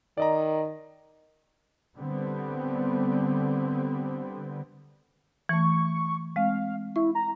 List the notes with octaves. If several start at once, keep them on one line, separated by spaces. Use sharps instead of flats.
D#3 D5 D#5 A#5
D3 G3 B3 C4
E3 A3 C#6
G#3 C4 F5
E4 C#6
A#5